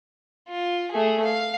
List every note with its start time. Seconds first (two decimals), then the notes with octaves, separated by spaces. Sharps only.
0.48 F4
0.91 A3 G#4
1.25 F5